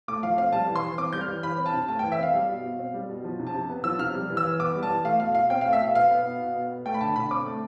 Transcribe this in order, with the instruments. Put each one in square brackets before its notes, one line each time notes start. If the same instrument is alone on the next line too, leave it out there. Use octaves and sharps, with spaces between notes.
[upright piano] A3 D6
F3 F5
C4 F5
G3 A5
E3
C6
E3
C4 D6
G3 G6
F6
E3
E3 B5
C4
A5
C3
A3 A5
G5
E3
E5
C4 F5
G3
B2
B2
C4
G3
B2
F3
C3
A5
C3
B3
F3 E6
C3 F6
G3
E3
E6
E3
B3 D6
G3
A5
E3
A3 F5
B2 F5
B2 F5
C4 G5
F5
A3
E5
B2 F5
B3 F5
B3
B2
B2
B3
B3
A3 G5
B5
D3 A5
D3 B5
C4 D6
A3